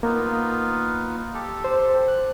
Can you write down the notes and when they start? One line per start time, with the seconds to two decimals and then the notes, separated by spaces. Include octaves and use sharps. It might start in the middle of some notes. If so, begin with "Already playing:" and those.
0.03 A#3 B3 D#4 F4
1.34 G4 A4
1.64 C5
2.08 F#6